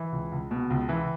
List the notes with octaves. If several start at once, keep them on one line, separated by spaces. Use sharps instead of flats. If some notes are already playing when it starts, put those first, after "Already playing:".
Already playing: E3
C#2
C#2
B2
C#2
E3